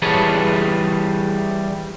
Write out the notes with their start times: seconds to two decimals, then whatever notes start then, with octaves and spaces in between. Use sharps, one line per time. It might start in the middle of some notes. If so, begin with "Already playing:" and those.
0.02 E3 G3 G#4 B4 C#5 A5